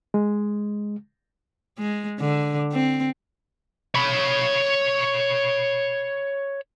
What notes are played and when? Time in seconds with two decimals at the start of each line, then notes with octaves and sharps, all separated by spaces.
0.14 G#3
1.79 G#3
2.20 D3
2.73 C4
3.95 C#5 B5